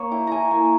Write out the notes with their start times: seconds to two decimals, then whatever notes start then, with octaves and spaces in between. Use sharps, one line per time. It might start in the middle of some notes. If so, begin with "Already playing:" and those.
Already playing: A#3 C#5
0.11 E4 G5
0.27 E4 G#5 A#5
0.51 A#3 G#5